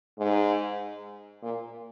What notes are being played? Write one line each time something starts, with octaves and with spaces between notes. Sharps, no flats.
G#2
A#2